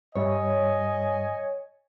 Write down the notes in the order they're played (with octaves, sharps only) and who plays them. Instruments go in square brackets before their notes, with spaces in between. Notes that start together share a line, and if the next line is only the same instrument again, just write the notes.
[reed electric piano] G2 G3 E5 [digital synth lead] C#5 [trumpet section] D#5 G#5